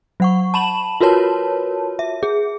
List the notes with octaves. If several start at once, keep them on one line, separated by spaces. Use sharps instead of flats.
F#3 F#5 C#6
A5 B5 E7 F#7
F4 F#4 A#4 B4 C#5 A5
E5
G#4